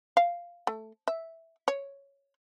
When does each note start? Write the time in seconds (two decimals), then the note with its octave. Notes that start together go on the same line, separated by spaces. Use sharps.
0.17 F5
0.67 A3
1.08 E5
1.68 C#5